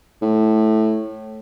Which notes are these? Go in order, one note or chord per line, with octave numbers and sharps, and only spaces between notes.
A2